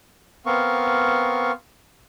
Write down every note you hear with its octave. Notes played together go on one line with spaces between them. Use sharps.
B3 C4 A#4 F5 C#6